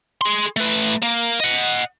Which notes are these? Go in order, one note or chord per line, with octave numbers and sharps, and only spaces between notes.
G#4 C6
A3 B4
A#3
D#5 F#5